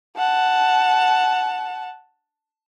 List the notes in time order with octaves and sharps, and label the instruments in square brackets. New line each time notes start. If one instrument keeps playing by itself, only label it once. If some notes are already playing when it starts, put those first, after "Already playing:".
[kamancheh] F#5 A5